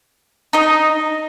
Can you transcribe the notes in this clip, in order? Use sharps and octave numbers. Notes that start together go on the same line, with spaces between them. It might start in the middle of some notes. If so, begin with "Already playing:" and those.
D#4 D#5